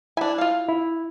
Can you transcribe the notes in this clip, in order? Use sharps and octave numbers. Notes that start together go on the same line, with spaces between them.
D4 E4 E5 G#5
F4 F5
E4